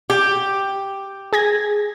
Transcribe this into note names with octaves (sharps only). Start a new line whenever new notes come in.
G4
G#4 G#6 A#6